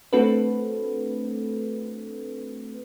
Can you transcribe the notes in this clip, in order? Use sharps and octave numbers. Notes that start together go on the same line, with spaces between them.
A3 C4 D4 F#4 A4 B4